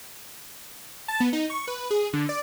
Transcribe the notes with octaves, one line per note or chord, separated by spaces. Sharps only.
A5
B3
D#4
C#6
B4
G#4
D3
D5